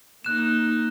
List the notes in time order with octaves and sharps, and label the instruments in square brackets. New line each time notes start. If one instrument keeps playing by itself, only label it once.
[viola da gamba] A#3 D#4 [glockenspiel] F#6 E7